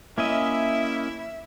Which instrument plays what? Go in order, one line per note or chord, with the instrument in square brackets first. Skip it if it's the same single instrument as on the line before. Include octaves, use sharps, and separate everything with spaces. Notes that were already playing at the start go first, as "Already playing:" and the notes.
[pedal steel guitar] A#3 C#4 D#5 [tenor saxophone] E4 [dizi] E5